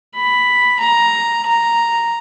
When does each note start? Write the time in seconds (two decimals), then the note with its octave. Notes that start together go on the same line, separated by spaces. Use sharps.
0.16 B5
0.81 A#5
1.47 A#5